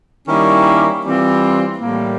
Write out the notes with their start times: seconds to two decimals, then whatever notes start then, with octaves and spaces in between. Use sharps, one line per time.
0.28 D#3 G3 A#3 C#4 E4
1.04 E3 G3 C4 F4
1.78 A2 E3 G3 A#3